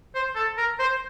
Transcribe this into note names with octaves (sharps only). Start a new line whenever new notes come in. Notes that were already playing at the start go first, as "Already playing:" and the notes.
C5
A4
A#4
C5